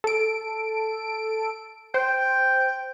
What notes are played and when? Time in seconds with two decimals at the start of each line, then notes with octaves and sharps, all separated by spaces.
0.04 A4 D7
1.94 C5 G5